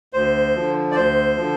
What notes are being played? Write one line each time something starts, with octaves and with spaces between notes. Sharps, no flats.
D2 C5
D3 F3
D5
D2 C5
D3 F3